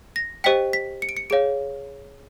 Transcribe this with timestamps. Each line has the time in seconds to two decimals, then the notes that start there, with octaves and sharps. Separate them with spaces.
0.16 A#6
0.44 G4 C5 D#5 G5 B6
0.73 B6
1.02 C#7
1.09 D7
1.17 C#7
1.30 G#4 C#5 F5 D7